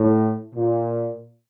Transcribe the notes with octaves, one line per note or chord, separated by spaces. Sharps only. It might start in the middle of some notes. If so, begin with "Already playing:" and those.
Already playing: A2
A#2